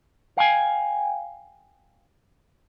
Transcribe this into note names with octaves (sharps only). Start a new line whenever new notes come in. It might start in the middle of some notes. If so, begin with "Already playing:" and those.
F5 G5 G#5